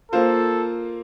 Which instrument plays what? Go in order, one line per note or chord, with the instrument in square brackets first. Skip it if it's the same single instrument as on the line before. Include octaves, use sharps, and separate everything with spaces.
[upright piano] A#3 F4 C5 [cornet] A4